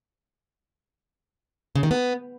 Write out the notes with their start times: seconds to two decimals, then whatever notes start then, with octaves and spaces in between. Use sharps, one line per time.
1.75 C#3
1.83 D#3
1.91 B3